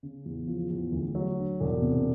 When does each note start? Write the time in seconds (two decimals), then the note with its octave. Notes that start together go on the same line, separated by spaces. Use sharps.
0.03 C#3
0.26 E2
0.48 F3
0.71 E2
0.92 D2
1.15 F#3
1.37 D3
1.60 E1
1.82 C3